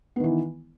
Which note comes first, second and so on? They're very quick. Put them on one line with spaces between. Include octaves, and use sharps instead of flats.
B3 D#3 E3